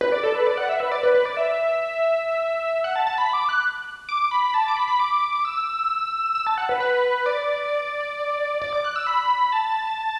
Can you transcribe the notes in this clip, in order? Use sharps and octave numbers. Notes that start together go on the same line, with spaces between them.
B4
D5
A4
B4
D5
F#5
E5
B4
D5
B4
B4
D5
E5
F#5
A5
A5
B5
D6
F#6
D6
B5
A5
D6
B5
B5
D6
E6
E6
A5
F#5
B4
B4
D5
D5
D6
F#6
E6
B5
A5